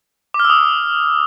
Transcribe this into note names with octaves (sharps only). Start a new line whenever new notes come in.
D6
F6
E6
D#6